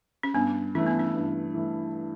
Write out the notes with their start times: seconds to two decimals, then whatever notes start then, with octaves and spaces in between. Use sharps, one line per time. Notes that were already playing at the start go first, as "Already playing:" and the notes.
0.23 C#4
0.34 G2 B3
0.75 E3 A3 C#4
0.86 B3
0.99 C#4
1.15 G2
1.54 E3 A3